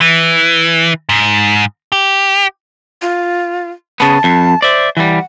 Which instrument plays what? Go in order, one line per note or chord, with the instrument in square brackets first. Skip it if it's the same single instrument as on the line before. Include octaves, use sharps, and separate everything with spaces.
[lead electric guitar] E3
G#2
G4
[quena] F4
[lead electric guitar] C#3 B3 [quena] A5
[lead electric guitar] F2
[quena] C5 [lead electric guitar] D5 E5
[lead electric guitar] E3 G3 [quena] F#5